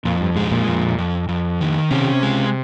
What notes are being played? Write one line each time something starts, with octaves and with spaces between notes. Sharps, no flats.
F2 A#2
G2
G#2 G#3
A#2
F2
F2
F2
D#3
C3 C#4
G#3